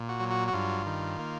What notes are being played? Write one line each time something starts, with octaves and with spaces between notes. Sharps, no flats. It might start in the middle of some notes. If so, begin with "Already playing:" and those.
Already playing: A#2
F#4
F#3
F#4
F#4
G2 F4
D#3
A#3